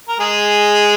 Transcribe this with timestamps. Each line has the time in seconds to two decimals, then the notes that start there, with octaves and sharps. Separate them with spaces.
0.08 A#4
0.20 G#3 G#4